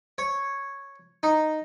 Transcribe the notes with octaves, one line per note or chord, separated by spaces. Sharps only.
C#5
D#4